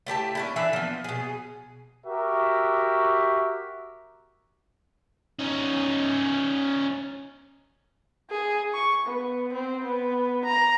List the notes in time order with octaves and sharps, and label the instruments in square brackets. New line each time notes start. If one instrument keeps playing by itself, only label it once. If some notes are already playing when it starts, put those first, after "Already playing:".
[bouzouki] A3 E4 G4 A5
C#4 D4 E4
E3 D4 A4 E5
F3 B3
B2 G#4
[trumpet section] F#4 G4 A#4 E5
[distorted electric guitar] C#4 D#4
[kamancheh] G#4
C#6
B3
C4
B3
A#5